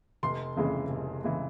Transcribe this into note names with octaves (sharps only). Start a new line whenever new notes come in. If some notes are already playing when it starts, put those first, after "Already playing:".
F1 C6
F2 C#3 E3 G#3
F1
C#3 E3 G#3